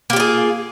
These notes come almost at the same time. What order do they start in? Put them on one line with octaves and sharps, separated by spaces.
A#3 G4 F4 G#4